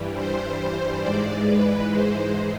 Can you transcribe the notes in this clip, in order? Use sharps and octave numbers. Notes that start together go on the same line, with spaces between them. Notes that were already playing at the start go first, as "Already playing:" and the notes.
Already playing: G2 E3 G3
C5
G#2 E3 G#3 D5
B4
C5